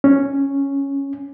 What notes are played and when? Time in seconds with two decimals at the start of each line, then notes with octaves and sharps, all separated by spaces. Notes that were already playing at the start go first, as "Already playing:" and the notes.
0.04 C#4